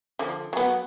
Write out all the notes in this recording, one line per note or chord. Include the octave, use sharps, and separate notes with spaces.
D3 F3
F#3 B3